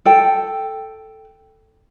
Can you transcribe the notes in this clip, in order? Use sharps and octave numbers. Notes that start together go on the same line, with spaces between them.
A4 G5